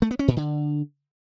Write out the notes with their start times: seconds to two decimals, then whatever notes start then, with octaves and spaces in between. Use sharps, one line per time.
0.02 A3
0.11 B3
0.19 C#4
0.28 A#2
0.37 D3